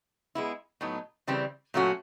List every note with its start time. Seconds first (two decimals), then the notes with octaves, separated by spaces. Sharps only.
0.35 G#3 B3 E4
0.81 A2 F#3 B3 D#4
1.27 C#3 E3 G3 C4
1.74 A#2 F#3 A3 C#4 F#4